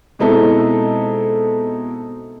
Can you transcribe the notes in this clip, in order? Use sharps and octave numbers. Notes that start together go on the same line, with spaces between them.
B2 G#3 C4 D#4 E4 A4